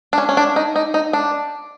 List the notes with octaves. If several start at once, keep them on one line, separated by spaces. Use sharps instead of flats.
D4
C#4
C#4
D4
D#4
D#4
D#4
D4